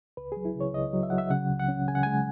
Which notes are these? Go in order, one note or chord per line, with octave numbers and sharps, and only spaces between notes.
C#2 B4
F#3 G#4
E4
C#3
C#5
C#2 D#5
F#3
E5
F#3 F#5
E5
C#3 F#5
C#2
F#5
C#4
C#3 G#5
F#5
G#3 G#5